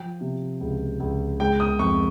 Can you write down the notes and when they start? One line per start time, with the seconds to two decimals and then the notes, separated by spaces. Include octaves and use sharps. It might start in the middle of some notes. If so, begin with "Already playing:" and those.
Already playing: F3 G5
0.21 C3
0.61 C#2
1.00 C#2
1.40 G#3 G5
1.60 D#6
1.79 F2 C#6